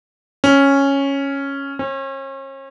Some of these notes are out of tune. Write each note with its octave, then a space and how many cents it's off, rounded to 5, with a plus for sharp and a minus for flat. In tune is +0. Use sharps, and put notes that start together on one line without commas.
C#4 -5
C#4 -40